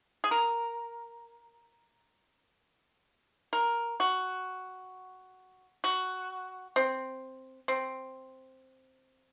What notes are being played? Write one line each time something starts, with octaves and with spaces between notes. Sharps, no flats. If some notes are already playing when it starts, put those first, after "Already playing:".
G#4
A#4
A#4
F#4
F#4
C4
C4